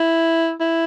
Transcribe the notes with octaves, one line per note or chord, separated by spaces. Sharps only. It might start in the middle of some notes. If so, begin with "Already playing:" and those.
Already playing: E4
E4